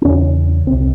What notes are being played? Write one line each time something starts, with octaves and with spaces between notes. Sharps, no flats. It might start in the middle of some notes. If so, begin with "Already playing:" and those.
C4
E2 C#3 C#4
C2 C3 C4